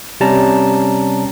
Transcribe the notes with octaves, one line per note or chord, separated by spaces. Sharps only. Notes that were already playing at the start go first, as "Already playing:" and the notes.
C3 G3 C#4 A5 A#5